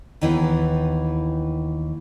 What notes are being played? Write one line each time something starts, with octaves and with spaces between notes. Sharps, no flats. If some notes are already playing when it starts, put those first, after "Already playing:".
D#2 D#3 E3 B3 G#4